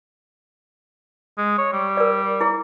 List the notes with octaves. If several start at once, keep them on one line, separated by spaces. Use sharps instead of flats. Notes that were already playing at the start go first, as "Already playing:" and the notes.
G#3
C#5
G3
A#4 D5
E4 G#4